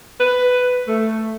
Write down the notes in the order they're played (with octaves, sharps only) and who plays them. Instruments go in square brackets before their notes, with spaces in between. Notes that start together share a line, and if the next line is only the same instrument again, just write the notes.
[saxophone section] B4
A3